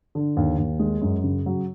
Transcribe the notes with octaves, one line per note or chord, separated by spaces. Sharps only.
D3
D#2
D#2
G#3
F#2
C#3
F#3